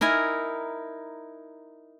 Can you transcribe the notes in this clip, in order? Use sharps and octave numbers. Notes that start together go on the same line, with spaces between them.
D#4 E4 A#4 G#5